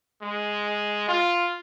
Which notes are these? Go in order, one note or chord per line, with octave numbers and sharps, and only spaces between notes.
G#3
F4